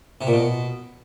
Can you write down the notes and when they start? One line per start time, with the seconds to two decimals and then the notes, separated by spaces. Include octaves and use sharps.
0.21 C3
0.27 A#2
0.33 B2